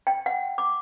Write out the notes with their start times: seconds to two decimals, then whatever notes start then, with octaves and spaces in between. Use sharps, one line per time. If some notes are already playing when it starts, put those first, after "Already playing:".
0.07 G5
0.26 F#5
0.58 D6